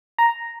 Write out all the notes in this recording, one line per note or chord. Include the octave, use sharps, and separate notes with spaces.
A#5